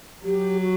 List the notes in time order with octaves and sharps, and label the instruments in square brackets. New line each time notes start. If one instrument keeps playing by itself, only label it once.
[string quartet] F#3 [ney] G4
[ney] F#4